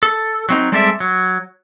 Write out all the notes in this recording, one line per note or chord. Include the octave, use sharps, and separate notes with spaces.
A4
F#3 C4 D#4
G3 G#3 C4 A4 D5 E5
F#3